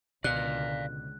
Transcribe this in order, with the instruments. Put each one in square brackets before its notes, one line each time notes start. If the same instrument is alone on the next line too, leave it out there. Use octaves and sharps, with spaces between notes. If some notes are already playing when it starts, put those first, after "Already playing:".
[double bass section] C#2 D3 [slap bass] B2 [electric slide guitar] D5 F5 [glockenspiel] F#6